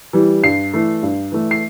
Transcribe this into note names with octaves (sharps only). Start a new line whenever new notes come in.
E3 G3
G2 C7
E3 A3
G2
E3 A3
C7